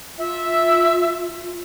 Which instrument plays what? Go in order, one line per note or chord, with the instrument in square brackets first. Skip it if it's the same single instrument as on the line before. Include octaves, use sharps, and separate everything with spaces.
[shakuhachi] F4 [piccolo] E5